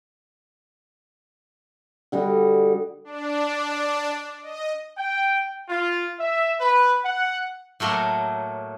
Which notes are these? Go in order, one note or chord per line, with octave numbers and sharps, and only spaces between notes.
D3 G3 F#4 D#5
D4
D#5
G5
F4
E5
B4
F#5
A2 F#3 A3 A#3 C6